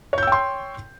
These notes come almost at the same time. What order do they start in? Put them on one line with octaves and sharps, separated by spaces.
C#5 G6 E6 G5 C6